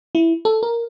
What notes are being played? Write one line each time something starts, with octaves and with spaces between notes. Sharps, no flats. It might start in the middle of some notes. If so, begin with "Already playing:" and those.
E4
A4
A#4